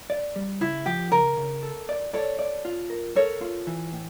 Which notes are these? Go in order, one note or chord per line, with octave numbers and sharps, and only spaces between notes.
D5
G3
C#3 E4
F3 G4
C#3 A#4
C#3
A4
D5
A4 C#5 D5
D5
F4
A#4
A4 A#4 C#5
F4
E3
A2